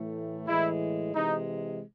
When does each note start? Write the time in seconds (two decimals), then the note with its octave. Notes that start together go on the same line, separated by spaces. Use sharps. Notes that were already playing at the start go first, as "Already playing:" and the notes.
Already playing: A2 E3 A3
0.47 A2 E3 G#3 E4
1.14 C3 E3 G#3 D#4